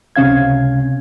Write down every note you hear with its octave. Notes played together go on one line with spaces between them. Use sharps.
C#2 C3 C#4 F5 G#6